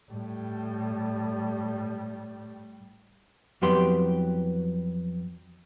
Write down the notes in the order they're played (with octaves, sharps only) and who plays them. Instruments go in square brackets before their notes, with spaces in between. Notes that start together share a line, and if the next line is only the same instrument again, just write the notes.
[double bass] A2 G3
[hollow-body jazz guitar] F2 E3 F#3 B3 G4 C6